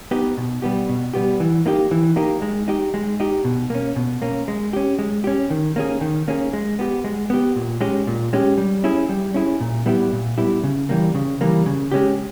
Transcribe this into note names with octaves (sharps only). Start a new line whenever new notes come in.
B3 D#4 G4
B2
G3 B3 G4
B2
G3 B3 G4
E3
A#3 D#4 G4
E3
A#3 D#4 G4
G#3
D#4 G4
G#3
D#4 G4
B2
A#3 C#4
B2
A#3 C#4
G#3
C#4 G4
G#3
C#4 G4
D#3
A#3 C#4 G#4
D#3
A#3 C#4 G#4
G#3
B3 G4
G#3
B3 G4
A#2
G#3 C#4 G4
A#2
G#3 C#4 G4
G3
C#4 E4 G#4
G3
C#4 E4 G#4
A#2
G3 B3 E4 G4
A#2
G3 B3 E4 G4
C#3
E3 G3 A#3
C#3
E3 G3 A#3
C#3
G#3 C#4 G4